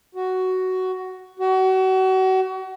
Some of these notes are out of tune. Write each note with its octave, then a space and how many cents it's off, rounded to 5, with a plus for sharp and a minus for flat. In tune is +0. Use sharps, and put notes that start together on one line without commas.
F#4 +10
F#4 +35